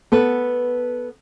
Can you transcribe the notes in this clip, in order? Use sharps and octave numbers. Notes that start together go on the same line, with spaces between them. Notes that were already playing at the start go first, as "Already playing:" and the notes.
B3 A4 B4